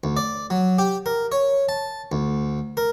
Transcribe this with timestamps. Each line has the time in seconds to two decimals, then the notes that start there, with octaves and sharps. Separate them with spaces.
0.04 D2
0.17 D5
0.50 F#3
0.78 G4
1.06 A#4
1.32 C#5
1.69 A5
2.12 D2
2.77 A#4